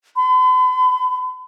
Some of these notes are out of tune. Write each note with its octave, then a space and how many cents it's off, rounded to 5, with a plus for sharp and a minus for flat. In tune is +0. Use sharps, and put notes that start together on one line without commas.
B5 +45